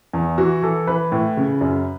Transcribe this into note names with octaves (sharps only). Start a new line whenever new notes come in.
E2
E3 F#4
E3 A4
E3 B4
A2
C#3
F#2